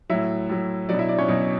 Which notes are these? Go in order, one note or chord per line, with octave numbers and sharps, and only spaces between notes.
A2 F#3 E4 E5
A2 F#3
B2 F#3 D4 D5
E4 E5
D4 D5
C#4 C#5
B2 F#3